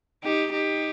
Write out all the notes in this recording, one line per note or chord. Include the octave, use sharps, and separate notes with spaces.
D#4 G4
D#4 G4